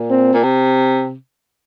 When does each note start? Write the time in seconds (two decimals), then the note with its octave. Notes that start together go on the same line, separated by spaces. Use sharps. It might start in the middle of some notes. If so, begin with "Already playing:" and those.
Already playing: A#2
0.10 C4
0.33 A#2
0.43 C3